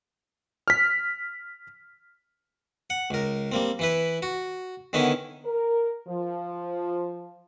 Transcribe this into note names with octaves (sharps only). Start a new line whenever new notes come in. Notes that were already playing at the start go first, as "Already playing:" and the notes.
F6 B6
F#5
C#2 A#4
G3 A#3 C4
E3 E4 B4
F#4
D3 D#3 B3 C#4 E4
A#4
F3